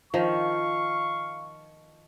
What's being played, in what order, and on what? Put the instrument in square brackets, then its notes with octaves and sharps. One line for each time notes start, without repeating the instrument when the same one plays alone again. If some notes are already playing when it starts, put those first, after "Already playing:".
[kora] D#3 F3 [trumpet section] F5 C#6